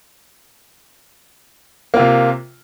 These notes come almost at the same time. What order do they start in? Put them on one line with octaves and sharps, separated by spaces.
A#3 F4 C3